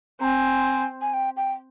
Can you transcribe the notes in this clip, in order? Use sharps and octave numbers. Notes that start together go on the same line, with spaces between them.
C4 G#5 A#5
G#5
G5
G5